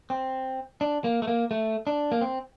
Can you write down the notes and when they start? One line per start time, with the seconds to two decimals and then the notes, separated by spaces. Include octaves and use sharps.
0.10 C4
0.81 D4
1.04 A#3
1.22 A3
1.28 A#3
1.51 A3
1.87 D4
2.12 A#3
2.21 C4